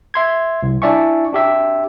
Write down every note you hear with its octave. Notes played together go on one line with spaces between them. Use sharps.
E5 C6 G#6
C2
D4 E4 D5 E5 G#5 C#6
D4 G4 E5